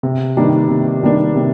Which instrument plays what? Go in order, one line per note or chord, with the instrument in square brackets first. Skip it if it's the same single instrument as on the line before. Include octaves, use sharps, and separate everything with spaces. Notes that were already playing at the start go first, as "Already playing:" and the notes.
[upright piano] C3
D#3 G3 A#3 D4
C3
D#3 G3 A#3 D4
C3